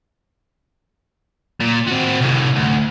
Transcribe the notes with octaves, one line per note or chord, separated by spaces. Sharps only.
A#2
C4 F#4
C2 A2
D2